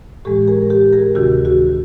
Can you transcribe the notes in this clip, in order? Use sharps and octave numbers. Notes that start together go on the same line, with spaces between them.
A2 E3 G#3 G4 A4
G#4 A#4
A#4
G4 A4
G#4 A#4
D2 C3 D#3 F#4 G#4
F#4 G#4